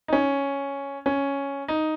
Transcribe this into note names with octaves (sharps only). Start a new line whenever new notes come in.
D#4
C#4
C#4
D#4